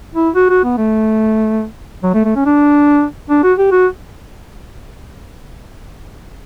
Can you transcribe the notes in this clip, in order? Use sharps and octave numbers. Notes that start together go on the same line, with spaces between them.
E4
F#4
F#4
B3
A3
F#3
A3
A3
C#4
D4
D4
F#4
G4
F#4